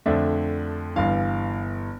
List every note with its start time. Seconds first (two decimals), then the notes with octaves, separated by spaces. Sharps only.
0.06 F2 D3 A3 D4 E5
0.96 G1 G2 E3 F5